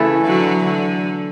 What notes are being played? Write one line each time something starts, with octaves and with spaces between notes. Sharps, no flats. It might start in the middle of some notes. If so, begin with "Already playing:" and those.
Already playing: C#3 E3 A3 E4 A4
D3 F#3
D3